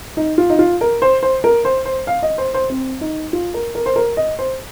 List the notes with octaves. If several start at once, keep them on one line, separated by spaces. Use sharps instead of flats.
D#4
F4
D#4
F4
A#4
C5
C5
A#4
C5
C5
F5
D#5
C5
C5
C4
D#4
F4
A#4
A#4
C5
A#4
D#5
C5